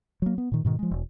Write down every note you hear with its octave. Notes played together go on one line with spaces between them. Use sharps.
F#3 A#3
B3
A#2 D#3
G#2 B2 D#3
F3 G#3
E1